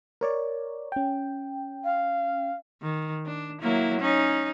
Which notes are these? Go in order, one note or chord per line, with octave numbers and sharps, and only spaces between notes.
A#4 C#5 D5
C#4 G5
F5
D#3
D4
F#3 A#3 E4
C#4 D#4